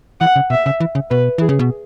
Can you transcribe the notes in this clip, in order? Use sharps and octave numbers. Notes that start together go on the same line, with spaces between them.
E3 F#5
C#3
B2 E5
C#3
E3
C#3
B2 B4
E3 G#4
C#3
B2